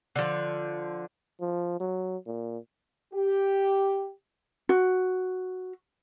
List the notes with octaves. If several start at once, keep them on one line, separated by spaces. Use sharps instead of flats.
D3 F3
F3
F#3
A#2
G4
F#4